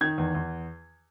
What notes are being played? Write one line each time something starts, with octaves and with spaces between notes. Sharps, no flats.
D#3 G#6
E2
E2